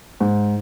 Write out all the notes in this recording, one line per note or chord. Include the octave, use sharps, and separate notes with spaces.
G#2